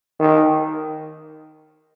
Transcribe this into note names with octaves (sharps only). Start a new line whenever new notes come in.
D#3